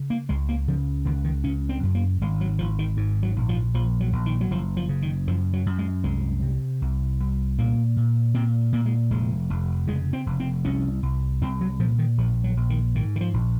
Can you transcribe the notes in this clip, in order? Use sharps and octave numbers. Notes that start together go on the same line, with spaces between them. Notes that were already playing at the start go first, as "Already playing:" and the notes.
Already playing: C#3
A#3
C#2 G#3
A#3
C#3 F3
C#2 D#3
D#3
C#3 C#4
C4
F#2
A#3
G#1 G#3
F#3
G#1 F3
D#3
G#2
F#3
A#1
F3
A#1 F3
F#3
A#1
D#3
F#3
F#1 F3
F3
C#3
D#3
F#2 F3
F#3
F#2
G#3
C2 G#3
C3
C2
C2
A#2 A#3
A#2
A#2 C4
A#2 A#3
G#3
F1 G#3
F1
C#3 G#3
C4
F1
C4
C2 C#4
C2
C2 C4
F#3
A#2 F3
D#3
A#1 F3
F#3
A#1
D#3
G#2 D#3
D#3
F3
A#1